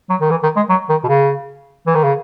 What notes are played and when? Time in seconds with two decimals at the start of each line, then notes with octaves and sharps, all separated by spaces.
0.10 F#3
0.21 D#3
0.30 E3
0.43 D#3
0.56 G#3
0.69 F#3
0.89 D#3
1.04 B2
1.08 C#3
1.87 E3
1.95 D#3
2.04 C#3